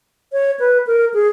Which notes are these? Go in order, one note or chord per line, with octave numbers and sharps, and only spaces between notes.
C#5
B4
A#4
G#4